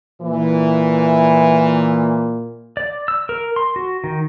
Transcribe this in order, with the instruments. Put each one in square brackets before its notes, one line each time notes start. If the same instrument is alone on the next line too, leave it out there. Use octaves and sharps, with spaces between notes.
[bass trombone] A#2 [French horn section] E3
[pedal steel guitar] D5
E6
A#4
C6
F#4
D#3